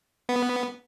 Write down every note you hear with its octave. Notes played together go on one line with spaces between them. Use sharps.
B3